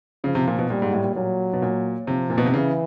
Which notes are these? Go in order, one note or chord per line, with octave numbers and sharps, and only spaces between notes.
C#3 F3
C3
A#2
B2
A#2 G3
G#2
A2
A#2
A#2 F#3
B2
A#2
C3 F3
A#2
B2
C3
C#3 E3